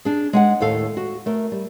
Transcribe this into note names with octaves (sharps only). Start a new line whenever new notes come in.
D4 G#4
G#3 F5 F#5
D#2 A2 A4 F5
F#4
A3 A#4
G3